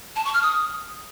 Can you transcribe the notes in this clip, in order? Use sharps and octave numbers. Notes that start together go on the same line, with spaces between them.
A5
C#6
F6
D#6